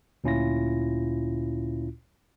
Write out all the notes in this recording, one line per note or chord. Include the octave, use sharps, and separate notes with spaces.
D2 A#2 C#4 E4 F4 A#6